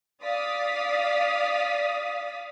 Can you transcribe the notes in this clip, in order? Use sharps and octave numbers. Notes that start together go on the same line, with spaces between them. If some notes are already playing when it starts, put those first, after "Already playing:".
D5 F5 D#6 A6 B6